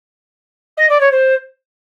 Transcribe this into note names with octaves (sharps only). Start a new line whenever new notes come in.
D#5
D5
C#5
C5